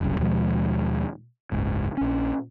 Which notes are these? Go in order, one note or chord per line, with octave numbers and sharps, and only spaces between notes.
F#1 C2 F#2
D#2 B2 F3 G#3
F#1 C#2 G#2
A#1 C#4